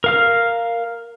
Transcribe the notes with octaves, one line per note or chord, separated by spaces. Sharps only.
A#4 F5 F6